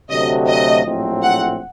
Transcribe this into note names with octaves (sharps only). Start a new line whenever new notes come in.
D2 C3 F#3 A3 D#5
D#5
A#1 A2 F#3 A3 C4
F#5